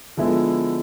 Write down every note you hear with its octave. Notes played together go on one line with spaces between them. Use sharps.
D3 F3 G#3 B3 E4